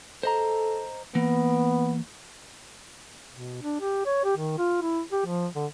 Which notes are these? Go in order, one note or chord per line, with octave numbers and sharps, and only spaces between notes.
A4 C5 D#5 A#5
E3 A#3 B3
B2
D4
G4
C#5
G4
D#3
F4
E4
G4
F3
D3